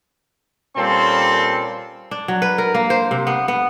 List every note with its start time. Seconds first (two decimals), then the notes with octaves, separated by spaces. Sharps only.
0.76 A#2 G3 C4 C#4 A4 C6
2.11 D4
2.28 F#3
2.42 B4
2.58 A#4
2.75 A#3
2.90 C5
3.11 C3
3.27 B3
3.48 B3